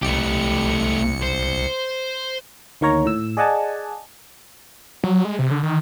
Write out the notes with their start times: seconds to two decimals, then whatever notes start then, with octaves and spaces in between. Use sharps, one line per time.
0.02 C2 A3 G4 C#7
1.22 C5
2.81 D2 D#3 A#3 A#4 C#5 A#5
3.06 A2 E6
3.37 G#4 D5 D#5 F#5 G#5 A5
5.04 F#3
5.25 G#3
5.39 C3
5.51 D3
5.63 D#3